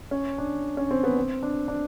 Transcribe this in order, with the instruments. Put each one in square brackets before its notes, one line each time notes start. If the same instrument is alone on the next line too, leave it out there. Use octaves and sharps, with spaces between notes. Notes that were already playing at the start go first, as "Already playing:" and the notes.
[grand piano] C#4
D4
C#4
C4
B3
C4
D4
D4